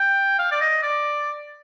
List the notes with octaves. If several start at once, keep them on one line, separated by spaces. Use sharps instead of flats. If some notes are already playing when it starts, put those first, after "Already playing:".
Already playing: G5
F5
D5
D#5
D5